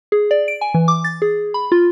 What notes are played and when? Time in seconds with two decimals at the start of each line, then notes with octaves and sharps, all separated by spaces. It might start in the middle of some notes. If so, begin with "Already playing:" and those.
0.12 G#4
0.31 D5
0.48 D7
0.61 G#5
0.74 E3
0.88 D6
1.04 A6
1.22 G#4
1.54 B5
1.72 F4